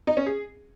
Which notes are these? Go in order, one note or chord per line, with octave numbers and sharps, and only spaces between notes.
D#4
C#4
G#4